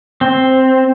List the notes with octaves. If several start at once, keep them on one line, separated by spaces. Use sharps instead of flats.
C4